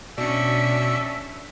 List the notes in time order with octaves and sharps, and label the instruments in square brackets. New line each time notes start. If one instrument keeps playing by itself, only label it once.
[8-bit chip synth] B2 C#7 [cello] C#4 D4 [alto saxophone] D5 [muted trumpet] E5